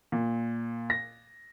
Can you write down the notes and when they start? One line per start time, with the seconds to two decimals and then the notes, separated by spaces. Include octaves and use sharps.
0.12 A#2
0.90 A#6